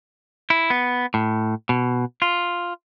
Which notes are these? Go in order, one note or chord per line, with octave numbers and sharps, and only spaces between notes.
E4
B3
A2
B2
F4